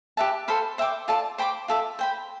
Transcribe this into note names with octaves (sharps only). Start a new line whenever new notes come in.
G4 B4 E5 A5
A4 C5 F5 B5
C5 E5 G5 D6
F4 A4 D5 A5
C5 G5 B5 D6
F4 A4 E5
C5 G5 B5